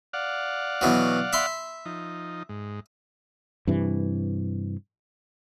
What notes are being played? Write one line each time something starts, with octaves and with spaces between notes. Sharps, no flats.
D5 F5 F#5
B2 E3 F#3
E5 B5 C6
F3 D#4
G#2
G2 C3 E3